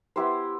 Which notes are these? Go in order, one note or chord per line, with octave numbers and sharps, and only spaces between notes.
B3 E4 G4 C5